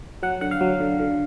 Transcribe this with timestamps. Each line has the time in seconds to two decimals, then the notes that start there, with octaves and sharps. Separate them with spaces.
0.23 F#3 F#5
0.41 D3 F#5
0.51 F5
0.61 F#3
0.80 D3
0.99 D3